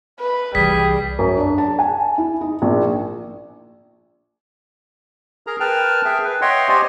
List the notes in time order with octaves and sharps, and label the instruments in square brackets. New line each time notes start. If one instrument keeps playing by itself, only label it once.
[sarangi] B4
[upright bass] C2 E3 [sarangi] G3 [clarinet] G#4 [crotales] B6
[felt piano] F#2
D4
A5
G#5
E4
D#4
A#1
[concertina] G#4 A#4 A#5
A#4 B4 G5 A5 F6
G#4 E5 G5
B4
C#5 D#5 E5 F#5 G5 C6
G4 C5 D5 D#5 G#5